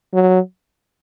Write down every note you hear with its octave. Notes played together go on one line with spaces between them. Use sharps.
F#3